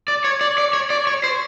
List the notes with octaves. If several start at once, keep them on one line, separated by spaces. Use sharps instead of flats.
D5
C#5
D5
D5
C#5
D5
C#5
C5